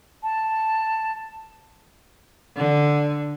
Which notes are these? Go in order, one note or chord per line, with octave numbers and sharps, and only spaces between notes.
A5
D3